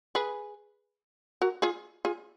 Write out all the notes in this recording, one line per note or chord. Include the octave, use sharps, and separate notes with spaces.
G#4 B4
F#4 A#4
F4 G#4
F4 G#4